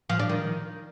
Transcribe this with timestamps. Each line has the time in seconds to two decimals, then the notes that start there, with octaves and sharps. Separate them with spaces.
0.10 F3
0.20 D4
0.29 D#3